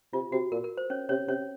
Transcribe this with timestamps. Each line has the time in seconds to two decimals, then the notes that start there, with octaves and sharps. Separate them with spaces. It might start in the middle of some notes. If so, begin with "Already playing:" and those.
0.13 C3 F4
0.32 C3 F#4
0.52 A#2 A#4
0.64 A#4
0.77 C5
0.90 C#4 C#5
1.09 C3 C#4 C#5
1.28 C3 C#4 C#5